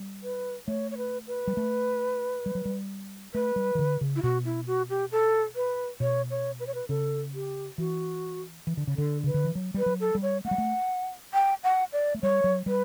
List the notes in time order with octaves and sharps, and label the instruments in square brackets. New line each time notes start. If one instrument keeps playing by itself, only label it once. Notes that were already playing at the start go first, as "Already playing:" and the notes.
Already playing: [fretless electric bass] G3
[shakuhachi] B4
[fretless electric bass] A3 [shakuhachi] C#5
[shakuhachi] C#5
B4
B4
[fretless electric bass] G3
A3
G3
F#3
G3
[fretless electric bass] A3 [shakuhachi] B4
[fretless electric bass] G3
E3
D3
C#3
[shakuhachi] E4
[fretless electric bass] B2 [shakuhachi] F#4
[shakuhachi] E4
F#4
G4
A4
B4
[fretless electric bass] B2 [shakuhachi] C#5
[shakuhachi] C#5
B4
C#5
B4
[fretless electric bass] C#3 [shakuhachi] A4
[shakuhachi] G4
[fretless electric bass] E3 [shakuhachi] F#4
[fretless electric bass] E3
D3
C#3
[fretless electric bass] D3 [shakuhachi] A4
[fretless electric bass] C#3 [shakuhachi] B4
[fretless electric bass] D3
E3
F#3
[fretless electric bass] G3 [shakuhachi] B4
[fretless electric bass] F#3
[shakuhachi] A4
[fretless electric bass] G3
[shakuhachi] C#5
[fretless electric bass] A3 [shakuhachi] F#5
[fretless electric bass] G3
A3
[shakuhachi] G5
F#5
D5
[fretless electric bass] A3
[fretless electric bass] G3 [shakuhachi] C#5
[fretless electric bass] F#3
[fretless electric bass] G3 [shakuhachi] B4